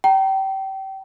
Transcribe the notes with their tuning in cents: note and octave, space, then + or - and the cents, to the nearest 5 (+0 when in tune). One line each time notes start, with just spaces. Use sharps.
G5 -30 A#5 +0